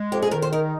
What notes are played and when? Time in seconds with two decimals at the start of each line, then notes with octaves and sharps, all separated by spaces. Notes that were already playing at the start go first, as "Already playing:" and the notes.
Already playing: G#3
0.12 F2 G4
0.22 G#4
0.31 D#3 A#4
0.42 C5
0.52 D#4 A#4